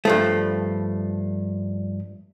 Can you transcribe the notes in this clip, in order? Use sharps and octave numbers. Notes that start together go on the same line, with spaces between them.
G2 F3 A3